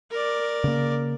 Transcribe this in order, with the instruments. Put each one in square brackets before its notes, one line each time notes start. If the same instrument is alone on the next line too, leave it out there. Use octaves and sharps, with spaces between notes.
[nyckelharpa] A#4 D5
[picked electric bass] C#3 A#3